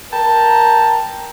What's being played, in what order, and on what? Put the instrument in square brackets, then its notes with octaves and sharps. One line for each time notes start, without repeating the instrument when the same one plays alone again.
[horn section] A#4 G5 A5 A#5